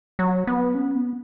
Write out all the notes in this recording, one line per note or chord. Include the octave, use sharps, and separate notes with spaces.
F#3
B3
C#4
B3